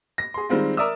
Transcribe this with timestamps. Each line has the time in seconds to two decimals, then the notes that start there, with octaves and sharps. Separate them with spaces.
0.18 A#6
0.34 G#4 C6
0.49 D#3 G3 G#3 C4 F4
0.77 A#4 D5 E5 D#6 E6